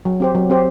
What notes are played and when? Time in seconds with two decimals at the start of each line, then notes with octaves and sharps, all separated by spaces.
0.05 F#3
0.20 C4 G4 C5
0.35 F#3
0.50 C4 G4 C5